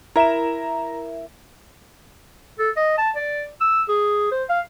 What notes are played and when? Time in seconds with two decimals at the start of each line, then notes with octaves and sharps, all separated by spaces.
0.16 E4 A#4 E5 A#5 E7
2.59 A4
2.76 D#5
2.98 A5
3.16 D5
3.61 E6
3.89 G#4
4.32 C5
4.50 F5